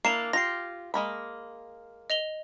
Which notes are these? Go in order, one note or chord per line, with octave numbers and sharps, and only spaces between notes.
A#3 D4 E4 C7 E7 F7
F4 G4 A#6 C7
G#3 A#3 B5
D#5 F7 G7